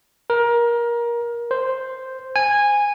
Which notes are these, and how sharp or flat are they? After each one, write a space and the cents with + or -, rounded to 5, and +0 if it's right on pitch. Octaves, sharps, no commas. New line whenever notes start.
A#4 +20
C5 +0
G#5 -15